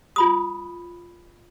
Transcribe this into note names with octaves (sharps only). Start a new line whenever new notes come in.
F4 B5 D#6